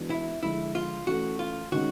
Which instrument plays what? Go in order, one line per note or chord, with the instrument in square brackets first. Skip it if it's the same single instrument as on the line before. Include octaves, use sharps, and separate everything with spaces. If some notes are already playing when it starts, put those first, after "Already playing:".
Already playing: [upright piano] E3 G#3 B3 D4 F#4
[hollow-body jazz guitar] E4
[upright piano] D3 F3 G#3 [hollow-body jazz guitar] E4
[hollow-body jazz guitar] F4
[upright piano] E3 A3 C#4 [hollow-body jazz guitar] F#4
[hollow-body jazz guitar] F4
[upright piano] D#3 G#3 C#4 [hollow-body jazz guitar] F#4